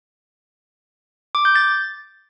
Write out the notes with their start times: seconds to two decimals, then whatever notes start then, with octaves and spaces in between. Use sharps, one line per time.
1.35 D6
1.45 G6
1.56 A6